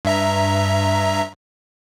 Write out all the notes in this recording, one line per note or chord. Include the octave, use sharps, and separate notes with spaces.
G2 E5 A#5